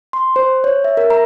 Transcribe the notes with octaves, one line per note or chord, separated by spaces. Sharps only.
C6
C5
C#5
E5
A#4
A#5